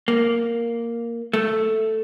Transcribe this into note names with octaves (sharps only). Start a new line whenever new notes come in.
A#3
A3